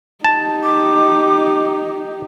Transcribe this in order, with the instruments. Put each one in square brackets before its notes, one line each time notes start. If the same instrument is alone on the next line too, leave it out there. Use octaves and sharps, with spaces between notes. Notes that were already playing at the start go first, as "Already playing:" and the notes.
[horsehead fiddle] D#4 G4 [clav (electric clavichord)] A5
[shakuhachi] D6